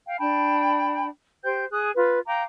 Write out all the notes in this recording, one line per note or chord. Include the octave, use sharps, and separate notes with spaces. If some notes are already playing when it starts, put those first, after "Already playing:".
F5 G5
D4 G5 A5 B5
G4 C5 G5 G6
G#4 D#6 F#6
F4 B4
F5 G5 A#5 D6